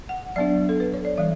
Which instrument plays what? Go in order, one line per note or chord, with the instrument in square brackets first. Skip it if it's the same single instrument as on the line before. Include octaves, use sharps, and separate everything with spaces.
[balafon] F#5
F#3 B3 D4 D5
A4
B4
C#5
D5
E3 G3 E5